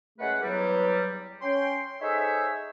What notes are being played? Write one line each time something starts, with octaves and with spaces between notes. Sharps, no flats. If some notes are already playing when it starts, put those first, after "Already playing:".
F#2 G#3 A3 G#4 B4 F#5
E2 F#3 G3
C#4 G5 C6
D#4 G#4 A4 C5 C#5 E5